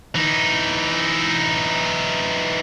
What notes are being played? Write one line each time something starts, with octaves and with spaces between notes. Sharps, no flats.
E3 D#4